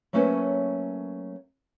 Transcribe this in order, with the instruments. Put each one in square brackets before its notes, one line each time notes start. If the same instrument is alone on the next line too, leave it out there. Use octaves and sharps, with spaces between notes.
[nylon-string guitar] F#3 A3 A#3 C#4 B4 C5